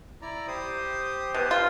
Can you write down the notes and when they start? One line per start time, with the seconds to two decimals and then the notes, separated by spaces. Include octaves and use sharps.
0.22 E4 D5 A#5
0.47 G4 C5 D#6
1.35 B2
1.51 F4